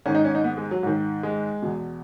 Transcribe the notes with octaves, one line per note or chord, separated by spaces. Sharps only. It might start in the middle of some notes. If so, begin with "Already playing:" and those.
G#2 D#3 C#4
D#4
C#4
D#4
B3
G#3
F#3
G#2 D#3
G#3
E2 B2